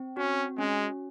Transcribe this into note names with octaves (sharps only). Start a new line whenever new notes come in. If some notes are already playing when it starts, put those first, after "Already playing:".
Already playing: C4
C#4 F#4
G#3 C#4